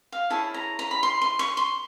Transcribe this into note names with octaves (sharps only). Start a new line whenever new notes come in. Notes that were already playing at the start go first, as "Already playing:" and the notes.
F5
E4 G#4 C#5 A5
A#5
A#5
B5
C6
C6
C#6
C6